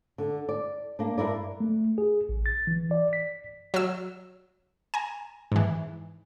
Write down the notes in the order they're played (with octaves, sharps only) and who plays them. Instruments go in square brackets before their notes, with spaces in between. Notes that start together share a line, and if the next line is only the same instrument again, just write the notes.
[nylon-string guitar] D3
D5
A#3 D4
G2 E4 A#4 D5
[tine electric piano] A3
G#4
A1
A6
E3
D5
B6
[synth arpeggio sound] F#3 E6
G#5 A#5
G#2 E3